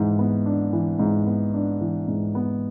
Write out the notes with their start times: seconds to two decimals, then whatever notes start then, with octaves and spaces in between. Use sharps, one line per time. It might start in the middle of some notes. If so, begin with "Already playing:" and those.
Already playing: G#2 E3
0.19 B3
0.46 D4
0.73 E3
0.99 G#2
1.26 B3
1.54 D4
1.81 E3
2.08 G#2
2.35 B3